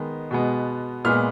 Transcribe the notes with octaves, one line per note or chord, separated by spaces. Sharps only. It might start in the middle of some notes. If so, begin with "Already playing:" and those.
Already playing: D#3 G#3 B3
B2 G#3 B3
A#2 G#3 B3 F6